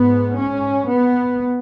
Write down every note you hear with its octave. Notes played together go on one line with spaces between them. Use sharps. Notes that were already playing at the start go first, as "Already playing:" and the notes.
Already playing: G#2 B3
C#4
B3